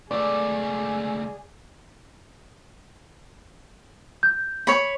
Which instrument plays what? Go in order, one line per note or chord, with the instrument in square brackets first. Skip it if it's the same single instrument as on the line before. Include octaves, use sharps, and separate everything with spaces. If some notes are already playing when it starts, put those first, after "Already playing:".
[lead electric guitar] C#2 A3 [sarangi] G#4 [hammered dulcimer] D5
[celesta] G6
[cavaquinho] C#5 B5